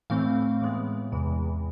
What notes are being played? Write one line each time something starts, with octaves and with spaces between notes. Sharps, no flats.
A2 E3 A3 C4 F5
A2 E3 G#3 B3
E2 C3 E3 G#3